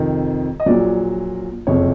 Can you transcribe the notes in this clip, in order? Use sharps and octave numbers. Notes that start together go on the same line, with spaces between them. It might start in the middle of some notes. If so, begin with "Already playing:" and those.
Already playing: F2 C3 D#3
D#5
A#1 A#2 F#3 D5
F#1 F2 C3 C#5